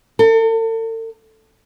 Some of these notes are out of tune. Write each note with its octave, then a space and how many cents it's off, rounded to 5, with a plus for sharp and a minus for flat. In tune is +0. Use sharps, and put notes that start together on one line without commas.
A4 +40